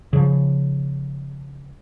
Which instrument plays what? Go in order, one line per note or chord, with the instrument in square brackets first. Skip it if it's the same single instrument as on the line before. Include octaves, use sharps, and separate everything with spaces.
[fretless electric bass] C#3 F3